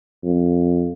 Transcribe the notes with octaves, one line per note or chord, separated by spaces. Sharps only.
F2